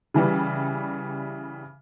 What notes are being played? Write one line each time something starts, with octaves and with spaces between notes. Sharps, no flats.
C#3 E3 G3